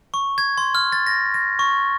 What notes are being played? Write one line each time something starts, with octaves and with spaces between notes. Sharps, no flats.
C#6
G#6
C6
F6
A6
A#6
A#6
C#6